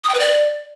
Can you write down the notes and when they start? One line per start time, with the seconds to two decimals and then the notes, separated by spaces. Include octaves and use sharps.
0.04 D#6
0.09 G5
0.14 B4
0.20 D5